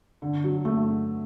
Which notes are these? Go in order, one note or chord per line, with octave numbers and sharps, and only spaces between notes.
D3
F#3
A3